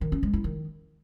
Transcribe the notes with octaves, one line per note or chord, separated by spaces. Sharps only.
D#3
C#4
G#3
E4
D#3